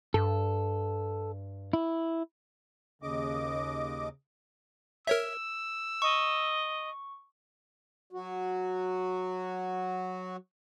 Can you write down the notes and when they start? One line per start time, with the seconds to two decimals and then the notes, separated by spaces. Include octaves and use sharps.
0.14 G2 A4
1.73 E4
3.02 D#2 C#3 D#5 D6
5.07 A#4 C#5 E5 E6
6.02 D#5 C#6
8.11 F#3 F#4